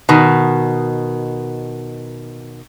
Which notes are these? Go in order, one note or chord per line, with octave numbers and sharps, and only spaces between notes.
B2 D#3